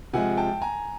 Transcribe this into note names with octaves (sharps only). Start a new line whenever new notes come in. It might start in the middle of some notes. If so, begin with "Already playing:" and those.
C3 F3 G#3 F#5 G#5
G5 A5
G#5 A#5